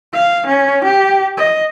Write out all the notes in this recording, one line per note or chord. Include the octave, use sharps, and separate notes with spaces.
F5
C#4
G4
D#5